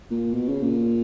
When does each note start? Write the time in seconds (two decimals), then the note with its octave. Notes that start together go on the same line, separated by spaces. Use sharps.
0.11 A#2
0.34 B2
0.48 C#3
0.63 A#2